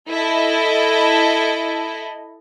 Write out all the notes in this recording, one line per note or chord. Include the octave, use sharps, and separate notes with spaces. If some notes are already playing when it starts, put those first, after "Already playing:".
E4 A4 D#5